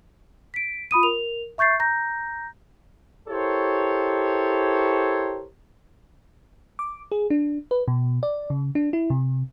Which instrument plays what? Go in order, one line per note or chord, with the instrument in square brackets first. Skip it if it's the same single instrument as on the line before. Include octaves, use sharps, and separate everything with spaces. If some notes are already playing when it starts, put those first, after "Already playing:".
[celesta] B6 D7
F4 B5 D#6 D#7
A#4 F7
E5 C#6 G6 A6 C7
A#5 G6 A#6
[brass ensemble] E4 G4 A4 A#4 C5 C#5
[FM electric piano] D6
G#4
D4
B4
B2
D5
C#3
D4
E4
C3